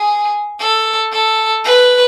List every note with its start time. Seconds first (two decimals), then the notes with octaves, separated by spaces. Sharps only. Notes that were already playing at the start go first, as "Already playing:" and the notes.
Already playing: G#4
0.59 A4
1.12 A4
1.65 B4